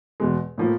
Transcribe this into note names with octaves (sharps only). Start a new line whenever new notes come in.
E2 B2 G#3
A2 F3 A#3